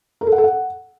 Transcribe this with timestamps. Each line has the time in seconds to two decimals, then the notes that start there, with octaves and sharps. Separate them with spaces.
0.21 A#4
0.27 A4
0.32 F#5
0.38 A4
0.44 F#5